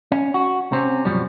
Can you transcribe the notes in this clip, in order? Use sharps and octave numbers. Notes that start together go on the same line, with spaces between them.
C#4
F#4
C3 C4 C#4
F#2 B2 F3 G3 C#4